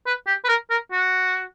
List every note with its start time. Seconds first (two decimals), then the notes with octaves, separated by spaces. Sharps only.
0.06 B4
0.27 G4
0.44 B4
0.49 A#4
0.70 A#4
0.92 F#4